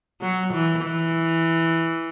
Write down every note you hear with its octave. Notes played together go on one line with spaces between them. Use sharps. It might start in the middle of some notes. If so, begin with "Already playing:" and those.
F#3
E3
E3